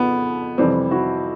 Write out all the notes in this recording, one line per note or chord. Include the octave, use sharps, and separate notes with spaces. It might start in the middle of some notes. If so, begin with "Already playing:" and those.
Already playing: F2 C#3 F3 B3
F2 C3 E3 G3 C4
E4 F#4